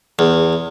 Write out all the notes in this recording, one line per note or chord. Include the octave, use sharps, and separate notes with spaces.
E2